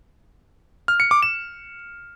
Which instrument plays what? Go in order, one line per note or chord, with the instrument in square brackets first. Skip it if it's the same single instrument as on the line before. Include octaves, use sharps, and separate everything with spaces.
[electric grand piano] F6
C#7
D6
E7